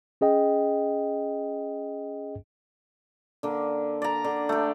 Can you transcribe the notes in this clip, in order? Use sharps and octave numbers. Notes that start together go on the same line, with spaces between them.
C#4 G#4 D#5 G5
D3 A#3
D5 A#5
D3
A3 G4